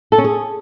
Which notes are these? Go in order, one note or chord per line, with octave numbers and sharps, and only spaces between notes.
A4
C#4
G#4